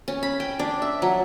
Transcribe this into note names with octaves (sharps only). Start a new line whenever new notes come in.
C#4
B5
G5
D4
E5
F#3